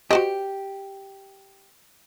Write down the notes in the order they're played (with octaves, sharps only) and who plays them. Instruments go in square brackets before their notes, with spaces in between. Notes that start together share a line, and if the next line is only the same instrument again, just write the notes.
[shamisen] F#4 C5 D#5 [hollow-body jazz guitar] G4